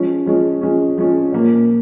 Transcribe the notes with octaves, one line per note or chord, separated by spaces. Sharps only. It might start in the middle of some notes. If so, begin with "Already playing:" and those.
Already playing: F3 G#3 C#4
F3 G#3 C#4
F3 G#3 C#4
F3 G#3 C#4
A#2 F3 A#3